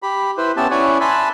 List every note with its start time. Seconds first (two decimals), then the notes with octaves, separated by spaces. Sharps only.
0.03 G4 B5
0.37 E4 B4 C5
0.57 B3 C#4 G4 E5 A5
0.71 C#4 E4 C#5 D5 F#5 G#5
1.01 E5 G#5 A5 B5 C6 F#6